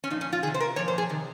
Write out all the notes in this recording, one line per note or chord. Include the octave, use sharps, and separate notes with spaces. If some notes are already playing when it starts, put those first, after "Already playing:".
C#4
A#2 F3 D#4
C#4
F4
C3 D#3 G#4
C5
A#4
A#2 F3 C#5
C5
G#4
C3 D#3